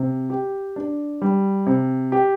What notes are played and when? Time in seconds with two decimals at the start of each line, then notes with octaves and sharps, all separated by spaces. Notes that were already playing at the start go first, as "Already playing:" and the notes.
Already playing: C3
0.30 G4
0.76 D4
1.22 G3
1.66 C3
2.12 G4